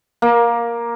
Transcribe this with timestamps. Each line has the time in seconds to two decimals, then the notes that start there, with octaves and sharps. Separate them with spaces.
0.22 A#3